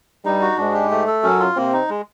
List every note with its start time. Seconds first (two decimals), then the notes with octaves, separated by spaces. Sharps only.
0.25 G2 G3 D#4
0.41 F#4
0.58 G#2 G#3 D4
0.74 G4
0.91 A3
1.07 A4
1.23 F#2 F#3 C#4
1.40 F4
1.57 C3 A#3 C4
1.73 D#4
1.89 G#3